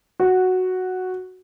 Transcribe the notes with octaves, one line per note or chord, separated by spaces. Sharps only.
F#4